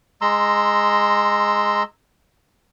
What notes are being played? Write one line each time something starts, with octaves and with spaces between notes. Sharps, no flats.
G#3 A#5 C6 E6